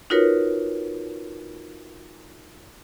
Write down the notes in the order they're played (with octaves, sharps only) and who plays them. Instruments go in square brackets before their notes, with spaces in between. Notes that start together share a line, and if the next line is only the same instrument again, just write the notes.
[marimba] D#4 F4 F#4 A#4 B4 C#5